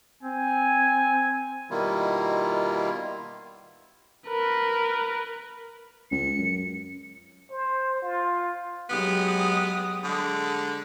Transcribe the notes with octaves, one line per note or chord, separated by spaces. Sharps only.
C4 G#5
B2 D#3 G3 A#3 E4 F4
A#4 B4
C#2 C#7
F#2
C5
F4
F#3 G#3 B3 G4 D#6
D3 G#3